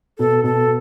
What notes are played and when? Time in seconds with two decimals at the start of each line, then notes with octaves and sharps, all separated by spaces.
0.19 B2 A4
0.44 B2 A4